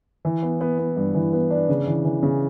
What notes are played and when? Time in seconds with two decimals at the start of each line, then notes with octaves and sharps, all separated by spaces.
0.25 E3
0.43 B3
0.61 B3
0.79 B3
0.97 G2
1.15 E3
1.33 B3
1.51 D4
1.69 C#3
1.87 E3
2.05 E3
2.23 C#3